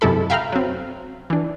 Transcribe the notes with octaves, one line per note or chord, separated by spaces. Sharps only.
F#2 C3 G#3 E4 A4 B5
E5 F5 G5 A#5 B5 F6
F#3 C4
E3 D4